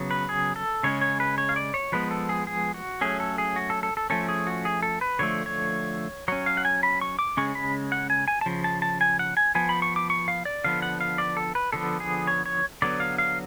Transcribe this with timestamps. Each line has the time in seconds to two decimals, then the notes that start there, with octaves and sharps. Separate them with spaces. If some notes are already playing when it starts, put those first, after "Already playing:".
Already playing: C#3 F#3 B3
0.11 B4
0.29 G#4
0.56 A4
0.83 C#3 G#3 C#4 C#5
1.01 C#5
1.20 B4
1.38 C#5
1.49 F5
1.56 D5
1.74 C#5
1.92 F3 G#3 B3 B4
2.11 A4
2.29 G#4
2.47 G#4
2.74 F#4
3.01 F#3 A3 C#4 G#4
3.20 A4
3.38 G#4
3.56 F#4
3.70 A4
3.83 A4
3.97 A4
4.10 F3 A3 C#4 A4
4.28 G#4
4.47 F#4
4.65 G#4
4.83 A4
5.01 B4
5.19 D3 F3 A3 C#5
5.46 C#5
6.28 F#3 C#4 C#5
6.46 F5
6.57 F#5
6.65 G#5
6.83 B5
7.01 C#6
7.19 D6
7.37 C#3 G#3 C#4 C#6
7.55 B5
7.92 F#5
8.10 G#5
8.28 G#5
8.41 A5
8.46 C#3 F3
8.64 A5
8.82 A5
9.01 G#5
9.19 F#5
9.37 G#5
9.55 F3 B3 G#5
9.69 B5
9.82 C#6
9.96 D6
10.10 C#6
10.28 F5
10.45 D5
10.64 D3 F3 B3 F5
10.82 F#5
11.01 F5
11.18 D5
11.37 A4
11.55 B4
11.72 D3 F3 B3 A4
12.00 G#4
12.27 C#5
12.46 C#5
12.82 D3 F#3 B3 D5
13.00 F5
13.18 F5